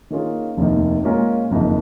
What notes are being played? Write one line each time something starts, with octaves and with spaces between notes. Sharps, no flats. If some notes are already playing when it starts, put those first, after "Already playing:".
D#3 A#3 C#4 F4 G#4
F1 D#2 D#3
A#2 G#3 C#4 F4 A#4
F#1 F2 D#3